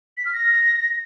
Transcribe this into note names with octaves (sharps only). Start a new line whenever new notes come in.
B6
F6
A#6